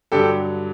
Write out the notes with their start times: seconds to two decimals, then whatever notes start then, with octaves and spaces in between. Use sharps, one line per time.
0.12 G2 D3 F#3 G4 A4